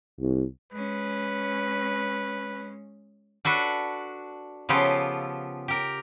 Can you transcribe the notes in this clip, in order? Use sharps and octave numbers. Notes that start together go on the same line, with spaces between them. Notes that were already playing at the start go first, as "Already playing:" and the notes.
C2
G#3 C#4 B4
D4 F#4 A4 B4
C#3 F3 B3 F4 G4 A4
G4 A#4